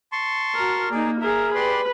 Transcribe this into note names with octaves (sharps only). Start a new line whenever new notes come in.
A5 C6 C#6
F#4 A#4
A#3 D#4 G#4 D5
G#4 A#4 E5
G4 B4 D5 C6